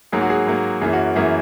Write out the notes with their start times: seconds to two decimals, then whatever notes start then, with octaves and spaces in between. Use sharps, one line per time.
0.12 G#2 F#3 A#3 G#4
0.22 F#4
0.30 G#4
0.47 G#2 F#3 A#3
0.81 F#2 E3 A#3 G#4
0.93 F#4
1.15 F#2 E3 A#3 G#4